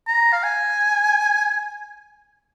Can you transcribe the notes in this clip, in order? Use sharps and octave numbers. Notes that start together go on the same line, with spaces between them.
A#5
F5
G#5